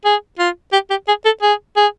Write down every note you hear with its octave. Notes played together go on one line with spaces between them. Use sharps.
G#4
F4
G4
G4
G#4
A4
G#4
G#4